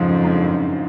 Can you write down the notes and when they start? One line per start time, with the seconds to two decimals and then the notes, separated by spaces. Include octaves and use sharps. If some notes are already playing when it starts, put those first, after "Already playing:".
Already playing: F2 G#2 C#3 F3
0.08 F#2
0.24 G#2
0.34 G2
0.42 F#2